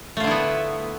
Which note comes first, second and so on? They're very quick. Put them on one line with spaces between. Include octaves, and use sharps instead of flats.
A3 F4 D3 E4 B3